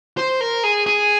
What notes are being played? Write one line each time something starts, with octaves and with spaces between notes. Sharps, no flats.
C5
A#4
G#4
G#4